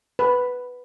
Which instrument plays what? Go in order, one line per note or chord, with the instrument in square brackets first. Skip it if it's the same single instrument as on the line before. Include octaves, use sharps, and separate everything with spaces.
[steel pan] B4